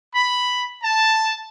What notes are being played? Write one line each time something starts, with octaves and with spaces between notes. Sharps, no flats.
B5
A5